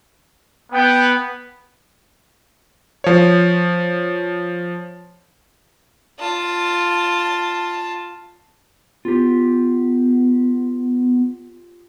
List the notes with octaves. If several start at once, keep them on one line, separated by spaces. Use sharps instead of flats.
B3 G5
F3 C#5
F4 A5
B3 F4 G4